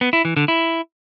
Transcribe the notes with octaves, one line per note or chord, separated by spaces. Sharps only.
B3
E4
E3
D3
E4